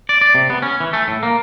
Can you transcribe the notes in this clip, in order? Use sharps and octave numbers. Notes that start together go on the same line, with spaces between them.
D5
D5
C3
B3
C#4
E3
A3
A2
A#3